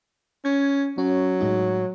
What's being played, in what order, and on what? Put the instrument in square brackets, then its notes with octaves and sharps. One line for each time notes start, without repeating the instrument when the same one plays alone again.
[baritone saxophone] C#4 [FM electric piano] G#6
[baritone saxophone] F#3 [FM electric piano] C#4
[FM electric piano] A2 G#3 D#4